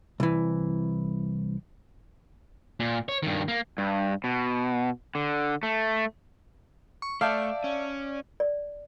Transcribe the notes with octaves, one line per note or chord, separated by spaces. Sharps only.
C2 E3
A#2
C#5
G2 D#3
A#3
G2
B2
D3
A3
C#6
A3 D5 E5 F5 A5 G6
C#4
D5